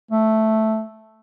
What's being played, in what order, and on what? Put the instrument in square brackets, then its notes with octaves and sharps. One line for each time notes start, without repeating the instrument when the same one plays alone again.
[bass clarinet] A3